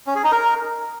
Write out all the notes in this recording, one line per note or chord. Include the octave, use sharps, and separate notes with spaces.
C#4
G#4
D#4
A#4